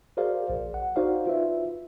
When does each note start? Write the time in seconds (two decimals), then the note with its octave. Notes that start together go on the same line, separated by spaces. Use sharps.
0.17 F#4 G#4 A#4 C5 D5 F5
0.50 A#1
0.74 F#5
0.96 D#4 F#4 C5 D5 F5
1.27 F4 B4 E5